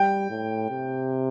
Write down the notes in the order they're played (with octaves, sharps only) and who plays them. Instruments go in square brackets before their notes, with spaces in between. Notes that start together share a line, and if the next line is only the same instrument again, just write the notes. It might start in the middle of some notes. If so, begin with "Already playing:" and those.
Already playing: [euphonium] G3 [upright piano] G5
[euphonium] A2
C3